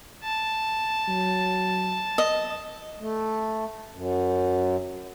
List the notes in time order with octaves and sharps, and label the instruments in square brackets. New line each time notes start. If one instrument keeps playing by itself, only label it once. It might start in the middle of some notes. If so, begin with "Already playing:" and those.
[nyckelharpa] A5
[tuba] F#3
[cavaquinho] D#5
[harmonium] A3
F#2